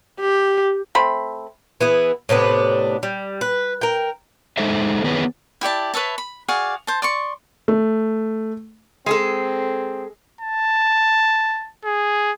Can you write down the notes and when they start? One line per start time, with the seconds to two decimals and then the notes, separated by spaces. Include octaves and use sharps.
0.20 G4
0.95 A3 C4 B5
1.81 E3 B3 G#4
2.29 A2 C3 B3 D4
3.03 G3
3.41 B4
3.81 A#4 G5
4.57 G#3 D#4 A4 C5 E5
5.04 D#3 B3 G#4 B4 C#5
5.61 E4 G4 D5 A5
5.94 B4 C#5 E5 A5
6.18 B5
6.48 F#4 G#4 D5 F5
6.87 C5 A5
7.02 D5 C6 C#6
7.68 A3
9.06 G#3 C4 G#4 A4
10.41 A5
11.85 G#4